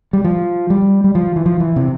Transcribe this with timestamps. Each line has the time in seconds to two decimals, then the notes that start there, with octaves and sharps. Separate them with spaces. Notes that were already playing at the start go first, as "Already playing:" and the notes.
0.13 G3
0.25 F3
0.70 G3
1.04 G3
1.15 F3
1.36 E3
1.46 F3
1.60 E3
1.76 C3